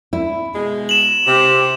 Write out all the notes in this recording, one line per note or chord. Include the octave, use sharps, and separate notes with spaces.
E4
B2 G#3
E7 F#7
C3 G4